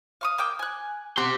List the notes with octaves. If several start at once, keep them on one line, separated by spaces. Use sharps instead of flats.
F5 C#6 D#6
A#3 G5 D6
G#5 F#6
G4 F#5 C6